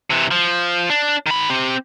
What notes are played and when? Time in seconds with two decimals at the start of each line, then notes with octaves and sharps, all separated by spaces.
0.10 C3 E3
0.31 F3
0.90 D4
1.26 D#3 B5
1.50 C4 G4